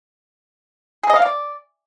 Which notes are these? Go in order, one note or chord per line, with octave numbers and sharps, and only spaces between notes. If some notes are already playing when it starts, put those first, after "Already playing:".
G#4
D#5
F5
D5